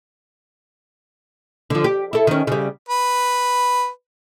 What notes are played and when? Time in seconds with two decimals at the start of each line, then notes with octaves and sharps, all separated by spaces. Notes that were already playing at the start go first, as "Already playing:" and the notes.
1.70 D3 F3
1.84 G4
2.13 E4 A4
2.27 D#3 C#4
2.47 C#3 G3
2.89 B4